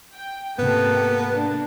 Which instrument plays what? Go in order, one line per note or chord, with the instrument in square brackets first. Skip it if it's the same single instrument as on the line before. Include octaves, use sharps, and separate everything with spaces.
[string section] G5
[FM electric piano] G#2 C3 [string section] A#3 G4 A4 [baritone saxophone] B3
[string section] A#3 D4